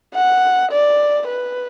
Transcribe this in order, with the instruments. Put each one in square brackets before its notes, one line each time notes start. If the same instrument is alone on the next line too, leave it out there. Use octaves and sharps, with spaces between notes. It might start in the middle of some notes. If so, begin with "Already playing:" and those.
[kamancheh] F#5
D5
B4